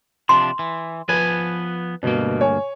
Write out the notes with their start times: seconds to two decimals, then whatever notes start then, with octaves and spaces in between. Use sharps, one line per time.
0.29 C3 F3 D4 C6
0.59 E3
1.09 F3 B3 B4 G#5
2.03 D2 G2 B2 A#3
2.41 C#5 G#5